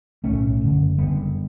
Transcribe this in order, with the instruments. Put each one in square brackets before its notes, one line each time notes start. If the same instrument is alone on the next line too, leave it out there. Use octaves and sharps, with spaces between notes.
[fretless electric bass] B1 A2 A3 C#4
F#1 F#2 D3
F#1 F#2 D3 G3 B3